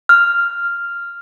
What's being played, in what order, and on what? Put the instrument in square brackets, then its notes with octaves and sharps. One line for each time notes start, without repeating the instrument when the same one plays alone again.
[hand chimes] F6